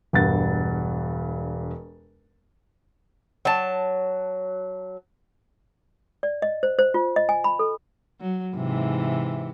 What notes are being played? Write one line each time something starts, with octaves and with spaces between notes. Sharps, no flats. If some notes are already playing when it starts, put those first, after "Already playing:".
E1 G2 F#5 A6
F#3 A5
D5
D#5
C5
C5
F4
D#5
G#5
B5
A4
F#3
G#2 C3 E3